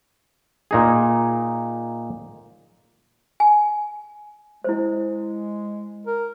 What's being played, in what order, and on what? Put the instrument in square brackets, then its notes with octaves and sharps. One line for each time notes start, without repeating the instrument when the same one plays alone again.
[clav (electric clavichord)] A#2 D#4 G#4
[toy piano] G#5
[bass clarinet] G#3 [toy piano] E4 C5
[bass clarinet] A#4